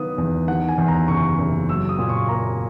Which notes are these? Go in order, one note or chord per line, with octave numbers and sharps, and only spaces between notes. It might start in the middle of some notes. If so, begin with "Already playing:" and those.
Already playing: D#3 F#3 B3 D#6
E2
D#3 F#5
G#5
E2
A#5
F#1 C#6
F#1
F#3 E6
D#6
A#2
C#6
A#3 A#5